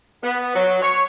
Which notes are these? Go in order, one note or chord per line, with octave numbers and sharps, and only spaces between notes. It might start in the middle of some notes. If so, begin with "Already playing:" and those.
B3
F#3
C#5